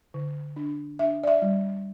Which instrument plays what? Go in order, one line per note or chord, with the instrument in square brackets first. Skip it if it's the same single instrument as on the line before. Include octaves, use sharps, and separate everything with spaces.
[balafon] D3
D4
D4 E5
D5
E5
G3